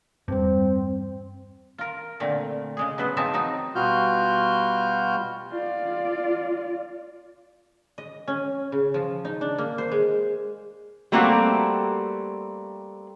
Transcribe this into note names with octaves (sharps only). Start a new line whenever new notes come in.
E2 G2 G3 C4
F4 A#4
A#2 D3 A3 C4
C#3 G#3 G#4
F#3 B3 B4 C5
F3 C4 D#4 G#4 E5 A5
F#3 C4 D#4
B2 G3 F4 F#4 F6 G6
F4 D5
D#5
C#4
C#3
F3
D#4
D4
A#3
C5
G#3
G3 A3 A#3 C4 F#4 G4